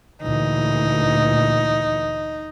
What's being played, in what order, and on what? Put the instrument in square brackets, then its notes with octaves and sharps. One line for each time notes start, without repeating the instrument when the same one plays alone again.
[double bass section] D2 A#2 E3 [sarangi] D#4